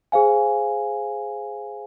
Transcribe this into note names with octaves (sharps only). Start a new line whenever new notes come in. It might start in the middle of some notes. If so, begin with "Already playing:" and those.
G#4 C5 F5 G#5